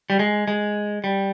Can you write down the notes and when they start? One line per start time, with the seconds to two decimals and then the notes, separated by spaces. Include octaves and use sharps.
0.10 G3
0.19 G#3
0.48 G#3
1.04 G3